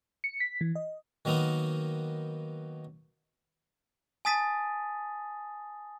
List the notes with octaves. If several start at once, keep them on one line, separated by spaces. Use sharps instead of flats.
C#7
B6
E3
D#5
D#3 F#3 A#3 B3 D#4
G#5 A5 D#6 A6 B6 D#7